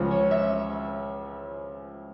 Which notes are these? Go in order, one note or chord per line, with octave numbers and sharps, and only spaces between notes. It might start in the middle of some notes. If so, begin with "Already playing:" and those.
Already playing: C#2 C#3 F3
C#5
E5